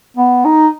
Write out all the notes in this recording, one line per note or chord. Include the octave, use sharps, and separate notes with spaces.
B3
D#4